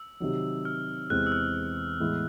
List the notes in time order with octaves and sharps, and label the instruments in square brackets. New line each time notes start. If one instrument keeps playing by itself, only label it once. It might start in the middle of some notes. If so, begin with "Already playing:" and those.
Already playing: [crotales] E6
[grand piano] C3 D#3 F#3
[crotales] F6
[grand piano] E2 C3 E3 G#3 C4 [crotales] F#6
[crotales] E6
F6
[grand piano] A2 E3 G#3 B3 E4